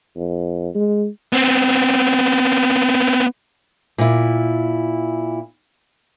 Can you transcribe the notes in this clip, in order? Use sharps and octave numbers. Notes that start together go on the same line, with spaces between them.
F2
G#3
B3 C4
A#2 E4